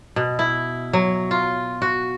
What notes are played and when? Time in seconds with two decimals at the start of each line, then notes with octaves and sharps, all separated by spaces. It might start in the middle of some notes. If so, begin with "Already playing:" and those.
0.16 B2
0.39 E4
0.93 F#3
1.31 F4
1.82 F#4